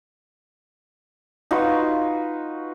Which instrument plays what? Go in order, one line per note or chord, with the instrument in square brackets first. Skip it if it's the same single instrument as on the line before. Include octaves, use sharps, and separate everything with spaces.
[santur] D#4 F4 F#4 B4